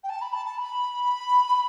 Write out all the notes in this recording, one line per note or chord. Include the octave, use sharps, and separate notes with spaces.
G5
A5
B5
A5
A5
B5